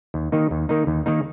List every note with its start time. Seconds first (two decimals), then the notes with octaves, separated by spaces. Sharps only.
0.14 D#2
0.32 D#3 A#3 D#4
0.51 D#2
0.69 D#3 A#3 D#4
0.87 D#2
1.06 D#3 A#3 D#4